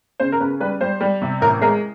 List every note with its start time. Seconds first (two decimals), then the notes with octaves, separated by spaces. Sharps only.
0.20 C#3 C5
0.32 A#4
0.40 C#3 B4
0.60 G3 B4
0.81 G3 C5
1.01 G3
1.22 C3
1.41 A1 A#4
1.62 G#3 A#4